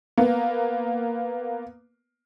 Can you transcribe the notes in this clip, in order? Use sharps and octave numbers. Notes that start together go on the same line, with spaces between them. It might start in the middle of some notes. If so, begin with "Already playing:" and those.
A#3 B3